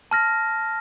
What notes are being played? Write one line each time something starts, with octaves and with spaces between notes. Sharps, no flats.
A5 F6 A#6